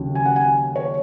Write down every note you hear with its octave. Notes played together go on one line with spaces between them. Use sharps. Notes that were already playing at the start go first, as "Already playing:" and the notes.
Already playing: D#2 C#3 F#3
G#5
F#5
G#5
C#5